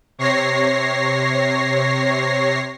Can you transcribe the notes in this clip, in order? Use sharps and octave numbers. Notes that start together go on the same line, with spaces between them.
C3 C#5 A#6 C7